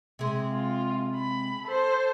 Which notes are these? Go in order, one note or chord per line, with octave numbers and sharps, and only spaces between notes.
C3 G#3
F4
B5
A4 C5